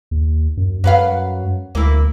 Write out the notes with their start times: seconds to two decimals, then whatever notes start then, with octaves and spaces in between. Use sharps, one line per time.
0.11 D#2
0.57 F#2
0.84 F#2 F#3 B4 F5
1.75 D2 A#3 E4